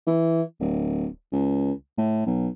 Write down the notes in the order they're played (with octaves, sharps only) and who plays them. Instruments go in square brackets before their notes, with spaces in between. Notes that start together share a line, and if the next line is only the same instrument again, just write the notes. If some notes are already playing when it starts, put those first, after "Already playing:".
[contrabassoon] E3
D1
C#2
A2
B1